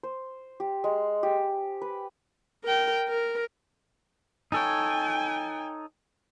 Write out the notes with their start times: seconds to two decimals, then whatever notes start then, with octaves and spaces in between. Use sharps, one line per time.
0.03 C5
0.60 G4
0.84 G#3
1.23 G4
1.82 B4
2.64 A#4 G5
3.09 A#4
4.52 D#4 A4 C#5 G5 G#5